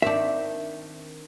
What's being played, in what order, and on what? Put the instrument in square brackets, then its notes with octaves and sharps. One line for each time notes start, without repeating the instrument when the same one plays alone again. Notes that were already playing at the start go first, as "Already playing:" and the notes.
[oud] D#3 C4 D4 [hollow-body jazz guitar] E5